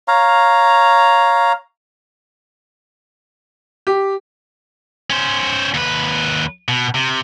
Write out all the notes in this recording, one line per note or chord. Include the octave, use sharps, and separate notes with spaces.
C#5 F5 A#5
G4
C#4 C5
D#2 B4
B2
C3